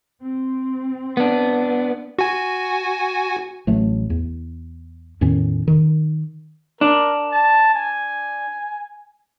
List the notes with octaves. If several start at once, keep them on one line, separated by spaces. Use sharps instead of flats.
C4
B3 D4
F#4 G#5
A1 F#3 A3
E2
E2 A2 D#3 C#4
D#3
D4 A#4
A5
G#5